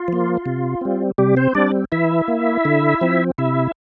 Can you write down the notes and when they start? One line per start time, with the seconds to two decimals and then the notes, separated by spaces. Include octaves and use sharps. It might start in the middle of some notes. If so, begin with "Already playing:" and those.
Already playing: F4
0.08 F3 A#3
0.46 C3
0.81 G3 C4
1.18 C3 G3 G4
1.37 C4 C5
1.55 G3 C4 D4 D5
1.92 E3 E4 E5
2.28 A#3
2.65 D3
3.01 F3 C4
3.38 C3 E4 E5